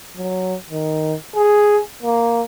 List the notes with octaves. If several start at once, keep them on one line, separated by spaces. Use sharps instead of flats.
F#3
D#3
G#4
A#3